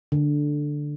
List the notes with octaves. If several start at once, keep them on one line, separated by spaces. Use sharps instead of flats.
D3